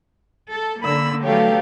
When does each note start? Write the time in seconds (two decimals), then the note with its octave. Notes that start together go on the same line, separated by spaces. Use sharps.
0.52 A4
0.83 D3 A#3 B5 E6
1.24 F#3 A3 B3 G4 A4 C#5 F5